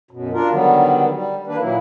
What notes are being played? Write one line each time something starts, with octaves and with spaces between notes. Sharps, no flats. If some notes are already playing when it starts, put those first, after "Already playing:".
F#2 B2
D4 F4 A#4
D3 D#3 F#3 G3 B3
G3
D#3 A#3 D4 B4
A#2 F#3 A#3 E4